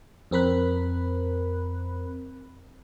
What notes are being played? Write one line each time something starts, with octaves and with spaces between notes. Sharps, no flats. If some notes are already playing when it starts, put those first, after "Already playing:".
F2 C4 A#4 B5 F#6